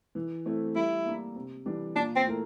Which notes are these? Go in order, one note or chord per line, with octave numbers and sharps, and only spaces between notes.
E3
A3 C4 E4
G3 E4
A#3 D4
C3
E3 G3 D4
A#2 D4
C4
A3 E4 A#4